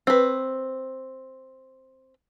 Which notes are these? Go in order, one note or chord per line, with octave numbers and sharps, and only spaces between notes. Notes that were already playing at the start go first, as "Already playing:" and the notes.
C4 B4